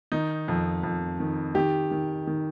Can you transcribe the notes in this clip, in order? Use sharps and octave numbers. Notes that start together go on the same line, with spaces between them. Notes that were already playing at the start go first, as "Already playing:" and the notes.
D#3 D#4
F2
F2
D#3
D#3 G4
D#3
D#3